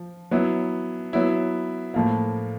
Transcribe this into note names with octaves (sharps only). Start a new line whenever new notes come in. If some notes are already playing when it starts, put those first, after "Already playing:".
Already playing: F3
F#3 B3 E4
F#3 B3 E4
A2 F3 A#3